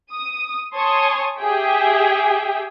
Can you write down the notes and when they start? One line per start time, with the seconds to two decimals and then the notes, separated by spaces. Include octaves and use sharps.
0.13 D#6
0.76 C#5 G#5 A5 C6 C#6 D#6
1.39 G4 G#4 E5 G5